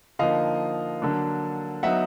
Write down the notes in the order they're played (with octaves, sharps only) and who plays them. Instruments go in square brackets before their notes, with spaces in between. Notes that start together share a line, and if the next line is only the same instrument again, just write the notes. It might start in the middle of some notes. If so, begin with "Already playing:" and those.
[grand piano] D3 F3 A#3 D#4 D#5 F5
D3 F#3 A#3 D4
F#3 B3 D#4 E5 F#5